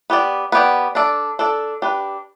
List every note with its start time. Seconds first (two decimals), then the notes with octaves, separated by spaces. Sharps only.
0.10 B3 G4 D5
0.52 B3 G4 D5
0.95 D4 A4 D5
1.39 D4 A4 D5
1.82 D4 G4 B4